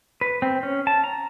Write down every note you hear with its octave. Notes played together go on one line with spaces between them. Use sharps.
B4
C4
C#4
A5
A#5